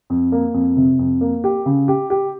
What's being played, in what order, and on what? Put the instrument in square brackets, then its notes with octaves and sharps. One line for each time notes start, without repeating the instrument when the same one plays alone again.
[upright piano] F2
A#3
F2
C3
F2
A#3
G4
C#3
G4
G4